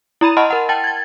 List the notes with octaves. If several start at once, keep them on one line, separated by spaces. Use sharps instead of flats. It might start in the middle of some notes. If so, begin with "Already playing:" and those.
E4 A#5 B5 D#7
D#5 F#5 A5 B5 C6 F6
A#4 F#5
G5 A5 A6
G#6 A6